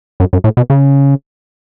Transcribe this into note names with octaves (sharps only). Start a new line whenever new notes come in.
F#2
F#2
A2
B2
C#3